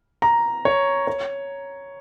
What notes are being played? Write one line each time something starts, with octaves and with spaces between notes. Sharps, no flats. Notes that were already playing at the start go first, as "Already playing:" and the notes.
A#5
C#5
C#5